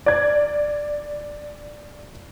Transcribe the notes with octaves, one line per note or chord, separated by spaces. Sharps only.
D5 G#6